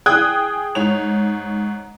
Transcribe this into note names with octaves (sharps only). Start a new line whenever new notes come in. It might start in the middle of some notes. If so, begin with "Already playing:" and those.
G#4 G5 D#6 F#6 G#6
G#2 C#5 F7